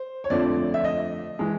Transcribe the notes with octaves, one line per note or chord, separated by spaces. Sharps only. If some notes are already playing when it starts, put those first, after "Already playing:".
Already playing: C5
C#5
F2 D3 F3 A3 C4 D5
E5
D#5
E3 G#3